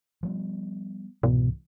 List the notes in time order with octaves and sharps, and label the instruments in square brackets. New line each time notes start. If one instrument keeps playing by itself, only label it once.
[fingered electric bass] F3 G3 B3
[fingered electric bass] C2 G#2 E3 [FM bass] B2